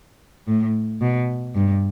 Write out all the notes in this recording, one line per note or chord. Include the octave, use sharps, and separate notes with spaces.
A2
B2
G2